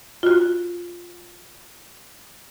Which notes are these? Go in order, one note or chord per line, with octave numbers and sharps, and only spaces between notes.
F4 F#4